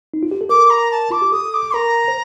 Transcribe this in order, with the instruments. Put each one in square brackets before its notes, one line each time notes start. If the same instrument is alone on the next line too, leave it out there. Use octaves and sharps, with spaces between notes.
[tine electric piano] D#4
F4
G4
A4
[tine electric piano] A#4 [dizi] D6
[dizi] A#5
A5
[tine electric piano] F4 [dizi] D6
[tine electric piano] G4
[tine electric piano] A4 [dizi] D#6
[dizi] D6
[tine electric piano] A#4 [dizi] A#5
[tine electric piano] C5